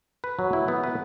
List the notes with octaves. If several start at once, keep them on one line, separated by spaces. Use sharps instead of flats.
B4
F#3
E4
B3
B4